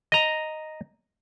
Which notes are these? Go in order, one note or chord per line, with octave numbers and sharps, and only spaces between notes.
D#5 A#5